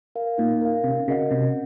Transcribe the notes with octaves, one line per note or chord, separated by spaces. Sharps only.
A#4 F5
A#2 D#4
A#4 F5
C3 C#4
C#3 F#4 A#4 D#5 F#5
C3 C#4